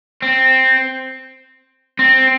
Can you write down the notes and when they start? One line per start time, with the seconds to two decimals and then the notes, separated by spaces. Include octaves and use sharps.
0.22 C4
1.99 C4